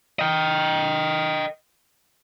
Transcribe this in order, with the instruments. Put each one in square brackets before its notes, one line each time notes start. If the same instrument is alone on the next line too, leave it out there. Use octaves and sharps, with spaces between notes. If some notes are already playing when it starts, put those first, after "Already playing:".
[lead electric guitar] D#5 G5